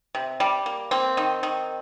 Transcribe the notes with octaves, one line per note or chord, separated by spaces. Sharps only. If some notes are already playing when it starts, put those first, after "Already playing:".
C3
G3
A#3
A#3 C4
D#3
D#3